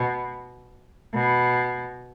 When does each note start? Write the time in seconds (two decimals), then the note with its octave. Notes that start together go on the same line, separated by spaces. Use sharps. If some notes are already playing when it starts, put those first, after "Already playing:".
Already playing: B2
1.14 B2